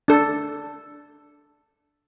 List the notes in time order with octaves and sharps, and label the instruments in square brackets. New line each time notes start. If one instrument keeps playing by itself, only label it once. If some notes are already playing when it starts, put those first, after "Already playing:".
[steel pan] D4 A4